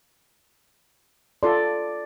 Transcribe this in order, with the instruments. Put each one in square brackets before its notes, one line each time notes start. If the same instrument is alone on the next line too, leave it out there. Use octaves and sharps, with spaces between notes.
[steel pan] F4 A4 C6 [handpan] D5